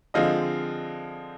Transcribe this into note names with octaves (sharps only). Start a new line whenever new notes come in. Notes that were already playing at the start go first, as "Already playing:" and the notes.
D3 F3 G#3 C4 D#5 F5